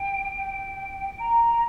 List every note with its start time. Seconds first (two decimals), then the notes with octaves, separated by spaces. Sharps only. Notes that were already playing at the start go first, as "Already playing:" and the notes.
Already playing: G5
0.37 G5
1.19 A#5